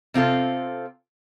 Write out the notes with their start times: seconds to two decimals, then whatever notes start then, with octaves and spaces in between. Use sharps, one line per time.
0.14 C3 C4 F4 A4